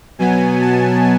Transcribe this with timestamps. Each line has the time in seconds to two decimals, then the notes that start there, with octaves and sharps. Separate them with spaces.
0.19 B2 F#3 B3 G#5
0.61 A5